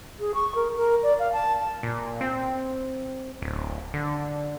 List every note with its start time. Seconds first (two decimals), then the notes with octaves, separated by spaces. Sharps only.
0.20 G#4
0.35 C#6
0.55 A#4
0.76 A#4
1.03 D5
1.19 F5
1.33 A5
1.83 A#2
2.21 C4
3.42 D1
3.94 D3